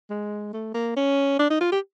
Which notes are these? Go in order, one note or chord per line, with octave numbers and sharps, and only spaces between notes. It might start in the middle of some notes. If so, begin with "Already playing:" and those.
G#3
A3
A#3
C#4
D4
D#4
F4
G4